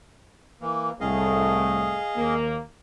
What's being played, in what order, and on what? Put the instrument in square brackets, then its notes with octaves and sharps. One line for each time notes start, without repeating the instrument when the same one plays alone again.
[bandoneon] E3 A#3
[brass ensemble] C2 A2 [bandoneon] G#4 D#5 F5
[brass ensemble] D#2 A#3